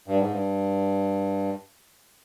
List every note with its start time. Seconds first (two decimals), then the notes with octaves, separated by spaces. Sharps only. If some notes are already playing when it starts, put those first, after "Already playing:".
0.08 G2
0.20 G#2
0.32 G2